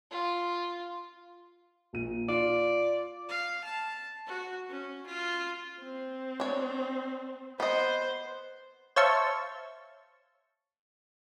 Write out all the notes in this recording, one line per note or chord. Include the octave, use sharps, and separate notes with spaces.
F4
A#1 A#2 D#7
F4 D5
F5
A5
F#4
C#4
F4
C4
D4 C#5
B3 C5 D#5
C5 C#5 E5 F5 A5 C#6